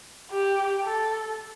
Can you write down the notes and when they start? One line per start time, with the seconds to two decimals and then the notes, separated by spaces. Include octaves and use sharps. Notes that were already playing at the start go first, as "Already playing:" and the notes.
0.31 G4
0.83 A4